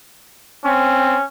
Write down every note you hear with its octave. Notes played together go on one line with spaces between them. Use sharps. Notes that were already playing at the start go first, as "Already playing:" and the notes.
C4 C#4